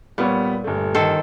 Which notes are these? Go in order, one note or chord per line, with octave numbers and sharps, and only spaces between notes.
A#2 G3 B3 C#5
G1 A3
D#3 A4 C5